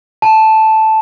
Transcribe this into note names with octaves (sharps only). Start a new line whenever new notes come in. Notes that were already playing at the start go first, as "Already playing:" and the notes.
A5